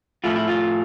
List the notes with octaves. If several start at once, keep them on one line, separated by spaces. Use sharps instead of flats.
A2 F3 A3 E4 F4
E4
F4